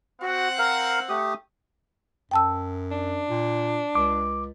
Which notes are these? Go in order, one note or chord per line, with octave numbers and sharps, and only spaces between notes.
C4 F#4 F#5
A#4 F5
A3 G4 D#6
F#2 G5 A5 E6
D4
A#2
C#2 D6